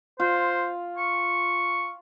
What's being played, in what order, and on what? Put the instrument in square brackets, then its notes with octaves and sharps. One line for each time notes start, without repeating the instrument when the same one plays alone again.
[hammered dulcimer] F4 [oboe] C5
[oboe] C#6